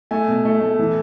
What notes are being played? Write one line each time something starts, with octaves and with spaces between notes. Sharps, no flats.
A3 G#5
B2
A3
A3
E3